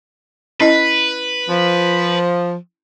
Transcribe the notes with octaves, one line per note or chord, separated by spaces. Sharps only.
C#4 E4 B4 D#5
F3